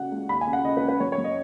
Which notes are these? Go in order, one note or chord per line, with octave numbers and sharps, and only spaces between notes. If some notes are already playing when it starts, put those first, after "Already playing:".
Already playing: C#3 F#3 F#5
C#2
D#2 B5
G#5
C#3
F#5
C#3 D#5
B4
C#3
B4
F#2 C#5
C#5
F#2
D#5